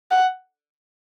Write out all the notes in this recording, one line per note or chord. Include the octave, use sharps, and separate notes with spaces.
F#5